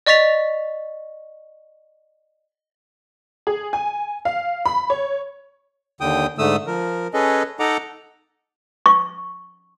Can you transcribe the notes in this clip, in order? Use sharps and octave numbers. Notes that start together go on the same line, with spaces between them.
D5 D#5 C#6 A6 B6 F7
G#4
G#5
F5
B5
C#5
D#2 D3 G5 D#6
G#2 D3 A3 D#6 E6
F3 A#4
C#4 G#4 A4 B4 D#5
D#4 A4 D#5 F#5 A#5 D6
C#6